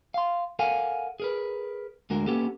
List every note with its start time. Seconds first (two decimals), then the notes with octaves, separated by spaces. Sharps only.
0.14 F5 C6
0.59 A4 A#4 F5 F#5 G#5
1.20 G#4 A#4 B4
2.10 D2 D3 G#3 F#4 A#4
2.27 A#3 B3 C#4 G4 A4